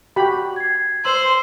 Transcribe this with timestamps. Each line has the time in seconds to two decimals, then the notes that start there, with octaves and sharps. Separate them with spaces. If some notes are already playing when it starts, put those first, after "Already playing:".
0.16 F#4 G4 B5
0.56 G#6 C7
1.05 C5 C6 E6 F#7